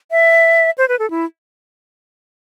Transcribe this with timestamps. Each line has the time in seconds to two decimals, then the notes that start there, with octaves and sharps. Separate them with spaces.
0.11 E5
0.78 C5
0.88 B4
0.99 A4
1.10 E4